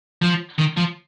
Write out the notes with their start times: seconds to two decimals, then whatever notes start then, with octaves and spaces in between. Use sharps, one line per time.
0.22 F3
0.58 D#3
0.77 F3